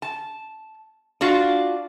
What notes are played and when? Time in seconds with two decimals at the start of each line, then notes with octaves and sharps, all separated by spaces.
0.02 A5
1.21 D4 F4 F#4 F5